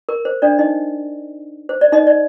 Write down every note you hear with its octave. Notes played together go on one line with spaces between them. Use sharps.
A#4
C5
D4 D5
D#4 D#5
C5
D5
D#4 D#5
D5